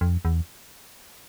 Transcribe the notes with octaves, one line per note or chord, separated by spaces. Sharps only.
F2
E2